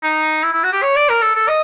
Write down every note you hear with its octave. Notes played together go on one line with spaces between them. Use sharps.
D#4
E4
E4
F#4
G4
C#5
D5
A#4
A4
A4
D#5